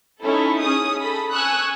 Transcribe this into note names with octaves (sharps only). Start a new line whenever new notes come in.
C#4 D#4 E4 A4
C#4 G#4 D#6
A4 B5
G#5 C#6 D#6 E6 F#6